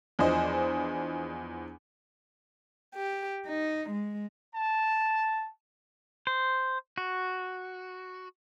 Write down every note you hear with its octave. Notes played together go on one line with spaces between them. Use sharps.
E2 F3 D4 C5 D#5
G4
D#4
G#3
A5
C5
F#4